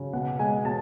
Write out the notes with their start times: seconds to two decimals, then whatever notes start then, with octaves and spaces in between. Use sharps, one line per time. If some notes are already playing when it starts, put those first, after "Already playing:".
Already playing: C#3 F#3
0.13 B2 F#5
0.39 G#3 G#5
0.65 B2 A5